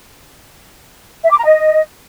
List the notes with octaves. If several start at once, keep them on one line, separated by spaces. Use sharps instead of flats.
E5
D6
A#5
D#5